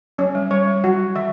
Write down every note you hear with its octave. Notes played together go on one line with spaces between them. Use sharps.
F#3 C#4
G3
G3 C#5
G3
F#3 F#4
E3 E5